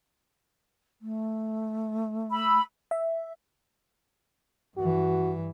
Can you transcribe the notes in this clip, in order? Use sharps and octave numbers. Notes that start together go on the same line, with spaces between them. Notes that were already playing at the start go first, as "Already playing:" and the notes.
A3
B5 E6
E5
G2 E3 F#4